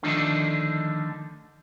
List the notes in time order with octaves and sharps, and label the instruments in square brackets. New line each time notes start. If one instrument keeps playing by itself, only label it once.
[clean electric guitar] D3 D#3 F3 A3 D4 D#4